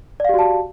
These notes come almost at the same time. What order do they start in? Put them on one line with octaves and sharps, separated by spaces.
D5 F5 G4 F#4 A5